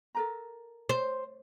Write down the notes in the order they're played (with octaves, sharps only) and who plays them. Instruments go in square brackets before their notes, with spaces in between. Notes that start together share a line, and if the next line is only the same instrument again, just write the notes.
[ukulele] A4 A#4 A#5
[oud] C5